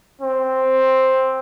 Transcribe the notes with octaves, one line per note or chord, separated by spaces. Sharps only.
C4